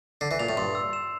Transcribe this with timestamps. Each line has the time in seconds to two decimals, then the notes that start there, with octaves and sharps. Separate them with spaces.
0.21 D3 C7
0.31 E3
0.39 A#2 F7
0.49 A2
0.57 G2 C6
0.75 E6
0.93 E7